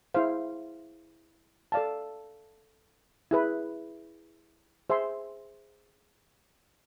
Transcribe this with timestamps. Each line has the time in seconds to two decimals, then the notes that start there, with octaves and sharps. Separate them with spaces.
0.14 E4 G#4 C5 F5
1.72 A4 D5 F5 A5
3.31 E4 G#4 B4
4.90 G#4 C5 E5 G#5 C6